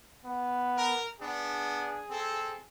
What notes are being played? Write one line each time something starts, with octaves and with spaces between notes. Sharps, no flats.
B3
A#4
B3 D4 G#4
C4 A4